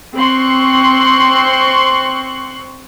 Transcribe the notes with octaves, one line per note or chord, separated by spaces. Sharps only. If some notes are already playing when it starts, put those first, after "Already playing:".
C4 C6 C#6 F#6